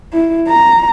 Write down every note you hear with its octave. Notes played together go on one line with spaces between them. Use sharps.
E4
A#5